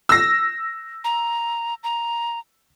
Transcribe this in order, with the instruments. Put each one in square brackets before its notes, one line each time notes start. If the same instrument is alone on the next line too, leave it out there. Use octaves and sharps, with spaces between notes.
[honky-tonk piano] E6 A#6
[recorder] A#5
A#5